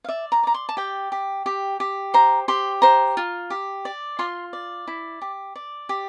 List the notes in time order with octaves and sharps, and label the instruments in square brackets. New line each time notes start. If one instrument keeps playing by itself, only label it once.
[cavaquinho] F5
D5 E5
A#5
D5 A#5
C6
A5
G4 G5
G4
G4
G4
C5 A#5
G4 C6
C5 A#5
F4
G4
D5
F4 C6
D5
E4
G4
D5
G4